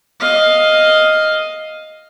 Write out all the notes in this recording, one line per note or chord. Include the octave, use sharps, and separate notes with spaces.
D#5 F5